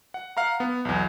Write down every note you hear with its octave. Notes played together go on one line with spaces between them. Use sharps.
F#5
F5 F#5 A#5
B3
B1 E2